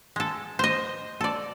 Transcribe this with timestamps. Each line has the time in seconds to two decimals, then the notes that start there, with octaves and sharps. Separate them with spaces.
0.16 G#3 A4
0.59 C5 D#5
1.21 A4 D5